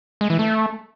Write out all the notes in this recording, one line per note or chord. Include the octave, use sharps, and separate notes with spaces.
G#3
E3
A3